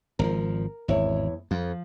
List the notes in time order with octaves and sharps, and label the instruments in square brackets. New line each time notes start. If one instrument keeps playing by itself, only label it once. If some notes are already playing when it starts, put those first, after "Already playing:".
[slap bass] G#1 C#3 F3 [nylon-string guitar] A#4
[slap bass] G#1 [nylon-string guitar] E2 E4 C#5
[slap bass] F2 [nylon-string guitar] F3